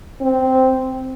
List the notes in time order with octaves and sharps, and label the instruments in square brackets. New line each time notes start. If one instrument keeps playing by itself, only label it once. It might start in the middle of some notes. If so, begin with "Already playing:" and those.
[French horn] C4